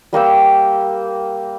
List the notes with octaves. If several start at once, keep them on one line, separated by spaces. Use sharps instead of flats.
G3 A#3 G5 E6